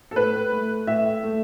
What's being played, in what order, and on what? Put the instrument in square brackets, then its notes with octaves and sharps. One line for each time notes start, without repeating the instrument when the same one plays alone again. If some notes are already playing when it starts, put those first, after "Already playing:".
[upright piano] A4
A2 B4
A3
A2 E5
A3